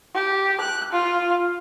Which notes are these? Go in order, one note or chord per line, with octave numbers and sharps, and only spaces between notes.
G4
F#6
F4